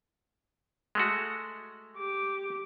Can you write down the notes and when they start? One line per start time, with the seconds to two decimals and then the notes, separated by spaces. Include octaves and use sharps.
0.95 G#3 A3 F#4
1.97 G4 D6